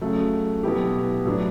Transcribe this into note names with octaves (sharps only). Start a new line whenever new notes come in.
C#3 F#3 A3
B2 F#3 B3 E4 G4
A2 F#3 B3 D4